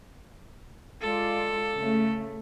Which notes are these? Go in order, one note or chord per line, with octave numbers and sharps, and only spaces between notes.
G#3 F4 A4 D5
C#3 A3